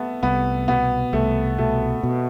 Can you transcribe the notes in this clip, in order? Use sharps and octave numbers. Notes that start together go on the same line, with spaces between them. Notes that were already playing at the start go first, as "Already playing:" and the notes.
Already playing: A3 B3
C2 B3
B2 B3
C2 A3
B2 A3
B2